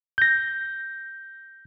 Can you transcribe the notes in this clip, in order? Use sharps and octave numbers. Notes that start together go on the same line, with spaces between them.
G6 A#6